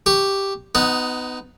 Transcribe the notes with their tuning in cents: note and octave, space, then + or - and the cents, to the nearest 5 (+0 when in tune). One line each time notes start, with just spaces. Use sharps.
G4 +0 C#6 +0
B3 +25 D#4 +0 F#5 -5